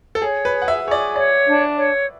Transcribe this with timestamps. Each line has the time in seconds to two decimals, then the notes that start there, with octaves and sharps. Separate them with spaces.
0.15 A4
0.22 G#4 C#5
0.45 B4
0.52 G#4
0.62 F#5
0.68 E5
0.84 G#4 C#5
0.91 D5
1.16 C#5 D5
1.46 D4
1.77 C#5